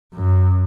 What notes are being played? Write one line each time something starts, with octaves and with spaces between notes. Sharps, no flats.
F#2